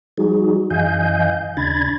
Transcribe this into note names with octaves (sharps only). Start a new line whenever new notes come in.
F3 G3 D#4 F#4 G#4
F#2 E3 D#5 F5 G#5 G6
D#2 C#3 D4 B5 G#6 A6